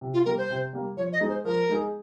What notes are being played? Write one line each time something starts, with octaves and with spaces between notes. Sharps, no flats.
C3
F4
G3 A#3 A#4
C5
C3
G3 A#3
F3 C#5
D#5
G#3 D#4 G#4
C5
F3 A#4
G#3 D#4 G#4